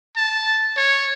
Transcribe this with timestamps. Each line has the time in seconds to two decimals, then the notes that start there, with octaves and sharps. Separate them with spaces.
0.16 A5
0.77 C#5